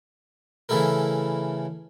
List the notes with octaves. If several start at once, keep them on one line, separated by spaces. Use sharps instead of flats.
C#3 E3 A3 E4 A4 A#4